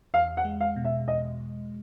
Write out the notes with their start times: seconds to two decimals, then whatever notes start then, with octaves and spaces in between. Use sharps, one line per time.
0.14 E2 F5
0.37 F#5
0.45 G#3
0.61 F5
0.76 B2
0.84 E5
1.07 E2 D#5
1.39 E2